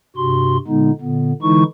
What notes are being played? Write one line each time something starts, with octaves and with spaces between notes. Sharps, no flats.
G2 C3 F#4 C6
A#2 D3 G#3 B3 D#4
A#2 D3 B3
D3 E3 G#3 D#4 E4 C#6